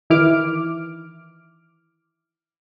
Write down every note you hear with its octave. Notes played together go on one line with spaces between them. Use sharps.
D#3 E3 E4 D6 F6 D7